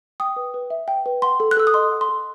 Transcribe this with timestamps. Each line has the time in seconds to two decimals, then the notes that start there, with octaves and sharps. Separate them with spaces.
0.20 G5 D#6
0.36 B4
0.54 B4
0.70 E5
0.88 G5
1.06 B4
1.22 F#5 C6
1.40 A4
1.51 F#6
1.57 A4 E6
1.67 D#6
1.74 D#5 C6
1.91 F#5
2.01 C6
2.09 A4